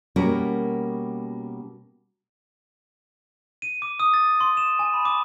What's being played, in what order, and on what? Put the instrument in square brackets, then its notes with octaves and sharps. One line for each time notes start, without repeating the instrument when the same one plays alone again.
[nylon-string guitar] B2 G3 A#3 C#4 F#4 A#4
[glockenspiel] D#7
D6
D#6
A6
C6
E7
G#5
B5
D6